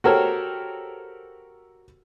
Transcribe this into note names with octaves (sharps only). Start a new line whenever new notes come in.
F#4 G4 A4 A#4 C5 C#5